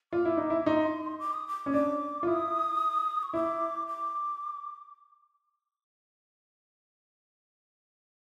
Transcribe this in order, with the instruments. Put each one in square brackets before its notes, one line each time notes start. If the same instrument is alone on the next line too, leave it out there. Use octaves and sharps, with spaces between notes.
[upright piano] F4 [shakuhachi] D6
[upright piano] E4
D#4
E4
[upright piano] D#4 [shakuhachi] C6
[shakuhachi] D6
D#6
D6
[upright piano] C#4
[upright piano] D4 [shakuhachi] D6
[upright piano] F4
[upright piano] E4 [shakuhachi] D#6
[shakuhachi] C#6
[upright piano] E4 [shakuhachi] D6
[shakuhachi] D6